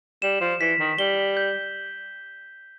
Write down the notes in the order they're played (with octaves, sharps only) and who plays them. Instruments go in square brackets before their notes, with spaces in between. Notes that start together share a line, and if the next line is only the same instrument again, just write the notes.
[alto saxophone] G3 [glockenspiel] E7
[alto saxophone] F3
[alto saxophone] E3 [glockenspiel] B6
[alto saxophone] D#3
[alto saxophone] G3 [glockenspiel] G7
[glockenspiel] G6